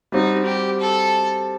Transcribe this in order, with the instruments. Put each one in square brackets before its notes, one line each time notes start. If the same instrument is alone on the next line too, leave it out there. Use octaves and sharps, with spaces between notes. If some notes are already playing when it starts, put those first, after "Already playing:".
[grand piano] G3 C4 F#4 [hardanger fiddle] D#4
[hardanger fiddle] G4
A4